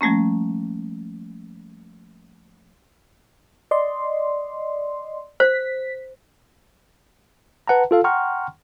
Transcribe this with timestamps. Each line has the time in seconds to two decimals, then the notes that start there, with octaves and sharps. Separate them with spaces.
0.01 F3 G3 A3 A#3 C#4
3.71 D5 D#5 C6
5.40 C5 B6
7.68 B4 F#5 A5 A#5
7.91 F4 A4 F5
8.04 F#5 G5 A#5 C6 C#6 F6